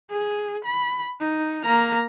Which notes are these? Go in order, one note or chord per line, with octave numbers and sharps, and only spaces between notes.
G#4
B5
D#4
A#3 A#5